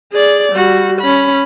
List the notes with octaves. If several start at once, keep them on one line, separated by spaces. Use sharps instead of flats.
G#4 D5
G3 F#4
C#4 B5